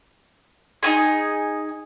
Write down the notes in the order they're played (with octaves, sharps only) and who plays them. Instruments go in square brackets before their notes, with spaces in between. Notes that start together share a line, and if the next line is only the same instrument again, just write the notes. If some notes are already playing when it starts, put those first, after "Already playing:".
[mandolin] D#4 F4 G#4